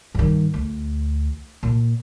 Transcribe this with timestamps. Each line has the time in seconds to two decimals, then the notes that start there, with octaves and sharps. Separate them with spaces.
0.15 G2 D#3
0.54 D2
1.63 A#2